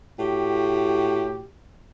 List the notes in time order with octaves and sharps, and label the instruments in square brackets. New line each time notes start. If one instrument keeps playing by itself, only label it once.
[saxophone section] A2 F#4 G4